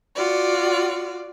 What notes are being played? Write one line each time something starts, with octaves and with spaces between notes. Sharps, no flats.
F4 F#4 D5